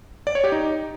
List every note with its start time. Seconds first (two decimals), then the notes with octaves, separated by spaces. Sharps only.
0.27 D5
0.35 C#5
0.44 G4
0.52 D#4